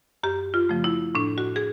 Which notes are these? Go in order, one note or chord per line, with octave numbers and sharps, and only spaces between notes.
F#2 G4
F4
C#3 F3 A3
E4
A2 D4
F#4
G#4